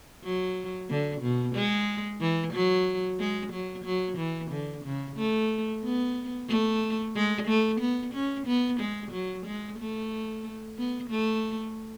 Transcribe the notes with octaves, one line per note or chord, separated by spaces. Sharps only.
F#3
D3
B2
G#3
E3
F#3
G#3
F#3
F#3
E3
D3
C#3
A3
B3
A3
G#3
A3
B3
C#4
B3
G#3
F#3
G#3
A3
B3
A3